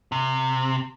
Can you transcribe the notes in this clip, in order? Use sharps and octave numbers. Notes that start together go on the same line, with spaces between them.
C3